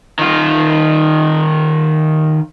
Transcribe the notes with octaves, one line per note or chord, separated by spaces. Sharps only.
D#3 F4